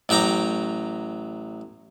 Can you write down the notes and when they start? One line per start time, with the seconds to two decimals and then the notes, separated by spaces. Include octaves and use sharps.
0.09 A1 F#3 G5 A#5 D6